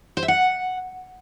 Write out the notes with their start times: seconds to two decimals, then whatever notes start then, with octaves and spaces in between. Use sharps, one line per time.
0.17 C5
0.23 E5
0.28 F#5